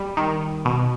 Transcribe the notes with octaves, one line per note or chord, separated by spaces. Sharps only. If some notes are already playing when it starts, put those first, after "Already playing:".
Already playing: G3
D#3
B2